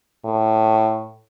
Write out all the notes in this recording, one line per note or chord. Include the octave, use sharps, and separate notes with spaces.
A2